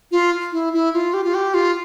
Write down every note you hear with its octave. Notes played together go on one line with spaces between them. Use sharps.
F4
E4
E4
F4
G4
F4
G4
F4